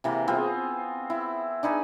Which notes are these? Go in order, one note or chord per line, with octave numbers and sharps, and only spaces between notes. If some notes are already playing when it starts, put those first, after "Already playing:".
C3 E3 A#3
B3 C4 F4 G#4
E4
D4 D#4 B4 G#5